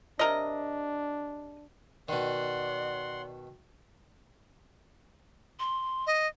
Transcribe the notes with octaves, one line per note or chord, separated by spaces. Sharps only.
C3 D4 A#4 D#5
B2 D#3 D5 F#5 C6
C6
D#5